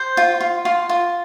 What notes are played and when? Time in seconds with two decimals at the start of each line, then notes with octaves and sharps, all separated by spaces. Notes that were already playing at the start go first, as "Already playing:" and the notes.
Already playing: C5
0.17 F4
0.41 F4
0.65 F4
0.89 F4